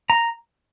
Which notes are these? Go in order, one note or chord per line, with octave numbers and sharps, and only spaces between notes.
A#5